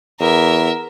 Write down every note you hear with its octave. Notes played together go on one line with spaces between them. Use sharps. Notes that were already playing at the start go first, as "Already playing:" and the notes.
E2 A#4 E5